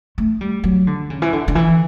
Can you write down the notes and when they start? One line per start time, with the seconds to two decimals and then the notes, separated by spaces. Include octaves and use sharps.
0.18 A3
0.41 G3
0.64 F#3
0.87 D3
1.10 C#3
1.22 E3
1.33 D3
1.48 D3
1.55 E3